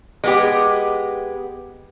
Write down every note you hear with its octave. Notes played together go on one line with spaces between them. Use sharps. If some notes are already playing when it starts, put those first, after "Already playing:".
G#3 B3 G4